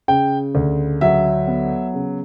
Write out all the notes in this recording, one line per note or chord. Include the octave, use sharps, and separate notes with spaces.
C#3 G5
D2
F#3 E5
B3
C#3